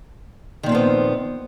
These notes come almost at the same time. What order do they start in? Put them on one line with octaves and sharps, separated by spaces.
D#3 A#2 F3 C4 B3